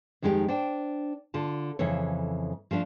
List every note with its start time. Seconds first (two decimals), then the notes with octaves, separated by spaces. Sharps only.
0.22 F2 D#3 G#3 D#4 E4 G4
0.48 D4 C5 G5
1.34 D3 F4 A5
1.79 F2 C#3 E3 A4 C#5
2.71 F3 A3 C4 D4